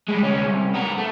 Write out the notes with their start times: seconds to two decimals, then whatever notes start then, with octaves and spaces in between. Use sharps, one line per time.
0.08 G3 G#3
0.22 D2 C#4
0.47 C2
0.74 B3 A#4
0.98 A3